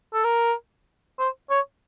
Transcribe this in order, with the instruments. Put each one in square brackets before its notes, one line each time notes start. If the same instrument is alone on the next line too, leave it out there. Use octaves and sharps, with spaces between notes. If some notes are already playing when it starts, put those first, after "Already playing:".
[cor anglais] A4
A#4
C5
C#5